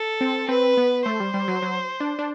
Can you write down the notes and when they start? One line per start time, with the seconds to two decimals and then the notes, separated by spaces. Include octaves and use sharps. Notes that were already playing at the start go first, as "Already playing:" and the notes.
Already playing: A4
0.21 C4
0.49 C4 B4
0.77 B3
1.06 A3 C5
1.20 G3
1.34 G3
1.48 F#3
1.62 F#3
2.00 D4
2.19 D4